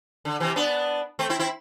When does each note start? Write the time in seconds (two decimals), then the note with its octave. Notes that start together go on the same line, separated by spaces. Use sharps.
0.25 D3
0.40 C3 E3
0.56 B3 D4
1.19 A3 C4
1.29 C4 E4
1.39 C4 E4